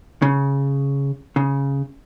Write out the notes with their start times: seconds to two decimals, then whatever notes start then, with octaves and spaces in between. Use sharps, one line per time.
0.22 C#3
1.36 C#3